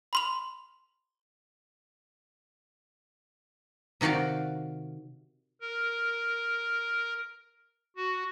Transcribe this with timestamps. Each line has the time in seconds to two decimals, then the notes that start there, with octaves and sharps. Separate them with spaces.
0.13 B5 C6 F7
4.01 C3 D#3 F#4 D5 F5
5.61 A#4
7.96 F#4